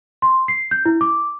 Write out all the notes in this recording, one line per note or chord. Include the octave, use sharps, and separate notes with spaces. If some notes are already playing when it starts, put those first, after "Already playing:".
C6
C7
G6
E4
D6